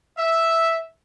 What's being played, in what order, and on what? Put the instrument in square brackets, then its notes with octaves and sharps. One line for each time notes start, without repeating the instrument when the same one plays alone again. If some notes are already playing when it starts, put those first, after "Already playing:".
[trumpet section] E5